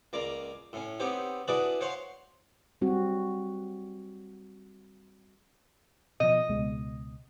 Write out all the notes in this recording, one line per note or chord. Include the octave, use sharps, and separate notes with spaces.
C#2 A#3 D5 A#5
A2 C#4
B3 C4 D#4 G4 C#5
D4 E4 F#4 G#4 B4 D5
C5 C#5 F5 F#5 C6 C#6
G3 C4 F#4
B2 F3 D#5
C#2 B2 G#3